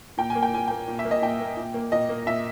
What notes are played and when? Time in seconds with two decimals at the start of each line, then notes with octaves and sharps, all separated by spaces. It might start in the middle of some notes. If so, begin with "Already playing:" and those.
0.18 A#2 G5
0.30 G#5
0.35 A#3
0.43 G5
0.53 A#2 G#5
0.68 A#3 G5
0.88 A#2
0.99 E5
1.05 A#3
1.11 D#5
1.22 A#2 G5
1.40 A#3
1.57 A#2
1.74 A#3
1.92 A#2 D#5
2.09 A#3
2.26 A#2 E5